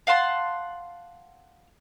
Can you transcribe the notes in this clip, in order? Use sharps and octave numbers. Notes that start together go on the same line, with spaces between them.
F5 F#5 A5 C6